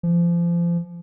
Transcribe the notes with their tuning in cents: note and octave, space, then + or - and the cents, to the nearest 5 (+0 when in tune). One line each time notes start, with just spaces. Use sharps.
F3 -30